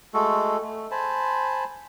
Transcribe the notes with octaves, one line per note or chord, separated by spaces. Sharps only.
G#3 A3 F#4 A4
A3
C5 G#5 A5 B5